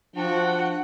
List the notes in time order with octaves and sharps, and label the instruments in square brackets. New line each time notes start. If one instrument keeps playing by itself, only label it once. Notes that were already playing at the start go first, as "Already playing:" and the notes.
[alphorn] F3 [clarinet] D4 [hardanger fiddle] F#4 G5 [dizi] F#5